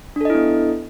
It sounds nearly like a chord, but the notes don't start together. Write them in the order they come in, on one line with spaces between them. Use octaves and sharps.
D4 A4 D#5 E4 B3